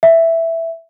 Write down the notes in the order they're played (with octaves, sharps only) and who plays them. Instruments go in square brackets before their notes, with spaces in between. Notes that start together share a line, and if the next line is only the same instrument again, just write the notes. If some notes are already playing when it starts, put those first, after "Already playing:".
[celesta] E5